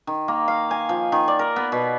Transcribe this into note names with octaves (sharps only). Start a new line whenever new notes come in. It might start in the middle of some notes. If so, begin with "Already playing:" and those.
D#3
A#3
F5
G#5
F3
D#3
D5
A#4
B3
B2